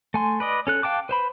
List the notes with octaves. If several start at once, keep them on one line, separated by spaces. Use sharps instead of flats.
A3 G#5 C6
B4 D5 D#5
C#4 A4 F#6
F5 G5 A5 D6 F#6
B4 C5 B5